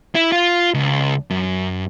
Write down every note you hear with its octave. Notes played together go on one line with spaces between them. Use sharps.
E4
F4
C#2
F#2